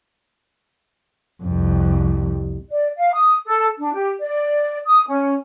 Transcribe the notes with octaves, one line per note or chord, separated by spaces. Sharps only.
C2 F2
D5
F5
D#6
A4
D4
G4
D5
D#6
C#4